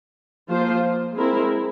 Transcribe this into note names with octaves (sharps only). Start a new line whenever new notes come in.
F3 A#3 F4 C5
G#3 C4 E4 A#4